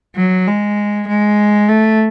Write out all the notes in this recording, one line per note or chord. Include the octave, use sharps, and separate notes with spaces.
F#3
G#3
G#3
A3